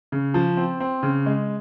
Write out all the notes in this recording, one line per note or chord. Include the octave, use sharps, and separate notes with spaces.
C#3
F3
C4
C4
C#3
G#3